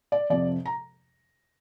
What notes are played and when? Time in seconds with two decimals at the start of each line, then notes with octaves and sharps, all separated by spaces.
0.12 D5
0.30 F2 C3 F3 D5
0.66 A#5